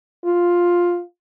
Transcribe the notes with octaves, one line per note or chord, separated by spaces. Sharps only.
F4